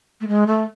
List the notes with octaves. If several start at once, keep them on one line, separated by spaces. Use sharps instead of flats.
A3
G#3
A3